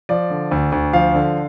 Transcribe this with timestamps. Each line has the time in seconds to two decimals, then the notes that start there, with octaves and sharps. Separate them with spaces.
0.09 F3 D5
0.30 D3
0.51 D2
0.72 D2
0.93 F3 F5
1.14 D3